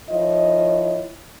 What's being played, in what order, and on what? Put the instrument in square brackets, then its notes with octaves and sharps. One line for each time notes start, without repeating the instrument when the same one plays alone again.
[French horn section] D#3 F3 E4 F4 C#5 D#5